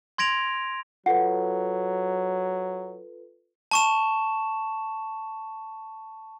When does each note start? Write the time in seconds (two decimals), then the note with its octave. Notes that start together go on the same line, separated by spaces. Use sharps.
0.18 C6 G#6 A#6 D7 F7
1.06 F#3 F4 A4 B4 F#5
3.71 A5 C#6 E7